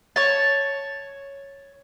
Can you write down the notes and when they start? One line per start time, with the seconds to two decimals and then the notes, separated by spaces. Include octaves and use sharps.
0.16 C#5 A5